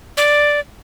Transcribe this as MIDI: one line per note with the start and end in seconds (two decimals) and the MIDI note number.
0.17 0.60 74